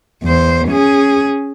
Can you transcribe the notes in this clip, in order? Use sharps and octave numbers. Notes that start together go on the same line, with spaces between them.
E2 C5
C#4 G#4